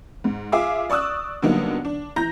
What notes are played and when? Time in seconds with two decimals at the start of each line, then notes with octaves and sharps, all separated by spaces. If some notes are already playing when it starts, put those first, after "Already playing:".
0.24 G#2
0.52 F4 G#4 E5 F5 D6
0.90 D5 C#6 D#6 E6 F#6
1.42 D3 F#3 G3 A#3 B3 D#4
1.85 D4
2.16 E3 A#5 G6 A#6